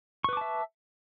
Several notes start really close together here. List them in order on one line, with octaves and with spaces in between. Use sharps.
C#6 B4 D6 A5 E5